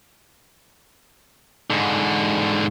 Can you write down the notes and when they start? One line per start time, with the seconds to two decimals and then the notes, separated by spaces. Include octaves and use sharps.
1.70 G#2 D3